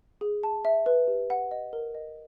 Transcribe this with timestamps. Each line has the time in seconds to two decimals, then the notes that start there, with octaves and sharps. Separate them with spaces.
0.21 G#4
0.43 A5
0.65 E5
0.86 B4
1.08 G4
1.30 F#5
1.51 D#5
1.73 A#4
1.95 D#5